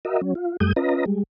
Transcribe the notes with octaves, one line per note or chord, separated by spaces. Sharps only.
F#4 A#4 D#5 E5
F#3 C#4
F4
F#2 G3 A3 D#6 G6
C#4 F4 B4 D#5 A#5
G3 G#3